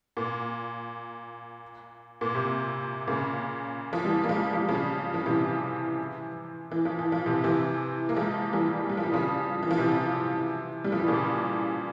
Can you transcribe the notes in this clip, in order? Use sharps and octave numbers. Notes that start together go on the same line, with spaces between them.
A#2
A#2
C3
A#2 C#3
F3
E3 G3
A#3
F3 G#3
F3
G3
C#3 F3
F3
C3 E3
E3
F3
E3
F3
C3 E3
C3 E3
A#3
F3 G#3
E3 G3
G3
F3
E3
C#3 F3
E3
F3
C3 E3
G3
F3
E3
A#2 C#3